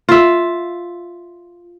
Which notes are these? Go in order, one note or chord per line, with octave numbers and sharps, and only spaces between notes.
F4 E5